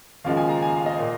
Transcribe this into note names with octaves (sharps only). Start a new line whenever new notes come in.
D#2 C#3 F3 G#3 F5
G#5
A#5
G#5
F5
D#5
A#2